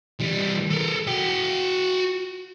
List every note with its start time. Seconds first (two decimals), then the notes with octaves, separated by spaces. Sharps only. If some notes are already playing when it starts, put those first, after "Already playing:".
0.20 E3 G3
0.71 A4 A#4
1.07 F#4 G5